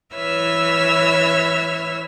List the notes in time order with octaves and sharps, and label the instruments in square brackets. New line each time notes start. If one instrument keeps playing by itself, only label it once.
[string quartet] E3 B4 C#5 E5 E6 F6